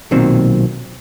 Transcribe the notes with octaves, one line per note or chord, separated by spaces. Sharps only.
B1 A#2 D#3 F#3 C4